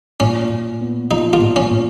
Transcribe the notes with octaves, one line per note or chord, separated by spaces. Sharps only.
A#2 C#4
A#2
B3
F3 D#4
F4
A#2
C#4
A#2